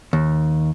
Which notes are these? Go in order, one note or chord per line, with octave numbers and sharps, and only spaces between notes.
D#2